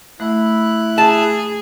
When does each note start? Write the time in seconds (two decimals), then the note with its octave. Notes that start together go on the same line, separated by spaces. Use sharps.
0.20 A3 E4 F#6
0.98 G#4 A5